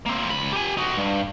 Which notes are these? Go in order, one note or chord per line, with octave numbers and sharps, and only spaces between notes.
A#3 C4
C#2 B5
G4 G#5
D#4 F#4
G2